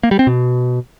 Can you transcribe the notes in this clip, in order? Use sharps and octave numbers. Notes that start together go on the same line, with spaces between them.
A#3
G3
C4
B2